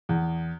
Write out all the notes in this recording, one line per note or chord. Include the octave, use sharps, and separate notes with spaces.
E2